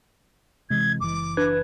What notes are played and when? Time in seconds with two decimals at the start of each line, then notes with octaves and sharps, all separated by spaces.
0.70 C3 E3 G#3 G#6
1.00 F#1 E3 D6
1.37 D4 B4 F#6 G#6